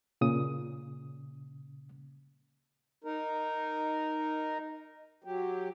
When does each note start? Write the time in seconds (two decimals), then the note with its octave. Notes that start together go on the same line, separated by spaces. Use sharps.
0.21 A#2 C#3 D#6
3.04 D#4 A#4
5.24 F#3 G4